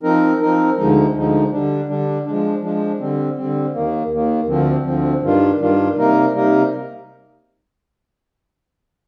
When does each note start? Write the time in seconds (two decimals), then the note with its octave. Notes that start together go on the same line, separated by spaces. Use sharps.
0.03 F3 C4 D#4 A#4
0.40 F3 C4 D#4 A#4
0.78 D2 D3 F3 G#3 D#4
1.14 D2 D3 F3 G#3 D#4
1.52 D3 G3 D4
1.89 D3 G3 D4
2.26 F3 G#3 D4
2.62 F3 G#3 D4
3.00 D3 G3 C4
3.37 D3 G3 C4
3.74 D#2 D#3 A#3
4.10 D#2 D#3 A#3
4.47 D2 D3 F3 C4
4.85 D2 D3 F3 C4
5.21 G2 D#3 G3 D4 F4
5.59 G2 D#3 G3 D4 F4
5.96 C3 G3 A#3 D#4 A#4
6.33 C3 G3 A#3 D#4 A#4